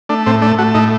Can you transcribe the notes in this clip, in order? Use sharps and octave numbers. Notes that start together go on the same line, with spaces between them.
A3 D4
A2 C4
A3 D4
A3 F#4
A2 D#4